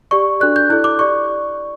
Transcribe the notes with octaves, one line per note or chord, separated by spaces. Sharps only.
G4 D5 C#6
D4 F#4 A4 D5 F#6
G6
E4 A4 D5 F#6
D6
G4 D5 C#6